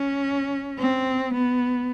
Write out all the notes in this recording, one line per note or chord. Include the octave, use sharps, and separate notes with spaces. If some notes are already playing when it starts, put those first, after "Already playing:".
Already playing: C#4
C4
B3